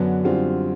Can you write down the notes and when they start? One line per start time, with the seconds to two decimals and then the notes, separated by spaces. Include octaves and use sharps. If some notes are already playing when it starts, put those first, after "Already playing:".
Already playing: F#2 D3 F#3 B3 D4
0.24 F#2 D3 G3 C4 F4